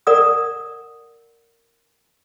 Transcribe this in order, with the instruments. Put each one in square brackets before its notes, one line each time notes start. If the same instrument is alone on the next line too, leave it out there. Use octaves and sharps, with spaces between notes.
[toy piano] A#4 D5 F#5 D#6